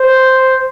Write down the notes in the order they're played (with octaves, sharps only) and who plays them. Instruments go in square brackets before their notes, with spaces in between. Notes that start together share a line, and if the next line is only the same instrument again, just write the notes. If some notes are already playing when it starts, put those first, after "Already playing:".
Already playing: [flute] C5